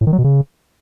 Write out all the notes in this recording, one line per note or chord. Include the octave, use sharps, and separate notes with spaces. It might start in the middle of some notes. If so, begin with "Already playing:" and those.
A2
D#3
F#3
B2
C#3